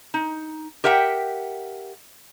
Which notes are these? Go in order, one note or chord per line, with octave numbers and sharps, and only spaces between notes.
D#4
G4 A#4 E5 F#5 G5